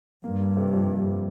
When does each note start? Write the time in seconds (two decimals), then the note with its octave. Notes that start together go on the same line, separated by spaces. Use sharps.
0.23 G2 A#3
0.40 G3
0.57 C3
0.73 F2
0.90 A#3
1.06 G3